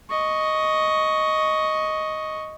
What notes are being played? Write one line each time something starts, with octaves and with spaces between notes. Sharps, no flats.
D#5 C#6